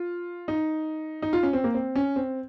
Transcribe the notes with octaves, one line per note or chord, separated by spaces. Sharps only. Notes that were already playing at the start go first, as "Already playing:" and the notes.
Already playing: F4
D#4
D#4
F4
C#4
C4
A#3
C4
C#4
C4